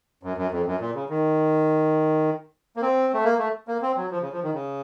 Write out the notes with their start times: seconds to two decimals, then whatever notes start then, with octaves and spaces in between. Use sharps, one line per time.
0.23 F#2
0.37 F#2
0.52 F2
0.66 F#2
0.81 A#2
0.95 C#3
1.10 D#3
2.77 A#3
2.82 C4
3.14 A3
3.24 A#3
3.39 A3
3.68 A#3
3.82 C4
3.96 F#3
4.11 F3
4.22 C#3
4.32 F3
4.43 D#3
4.54 C#3